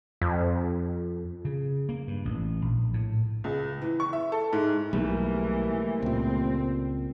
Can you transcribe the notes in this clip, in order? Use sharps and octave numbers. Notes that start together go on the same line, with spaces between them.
F2
C#3
A#3
G2
A1
A#1
A2
C#2
E3
C#6
E5
A4
G#2
B1 E3 G3 A3 A#3
C#2 A#2 C4